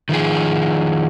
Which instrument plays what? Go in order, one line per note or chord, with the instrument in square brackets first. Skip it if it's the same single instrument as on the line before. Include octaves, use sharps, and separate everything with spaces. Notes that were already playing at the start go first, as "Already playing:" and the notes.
[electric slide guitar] D#3 F3 G#4